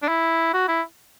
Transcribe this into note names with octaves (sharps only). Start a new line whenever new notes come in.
D4
E4
F#4
E4